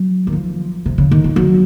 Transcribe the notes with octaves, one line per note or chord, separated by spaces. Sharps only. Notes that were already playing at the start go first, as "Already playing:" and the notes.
Already playing: F#3
D#3
F3
C3
C#3
D#3
F3
F#3